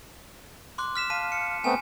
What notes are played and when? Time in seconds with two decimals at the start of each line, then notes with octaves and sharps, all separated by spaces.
0.78 C6 D6 F#6
0.95 F6 B6 E7
1.10 F5 A5 B6 D#7
1.32 C#7
1.64 A3 B3 C4 G#5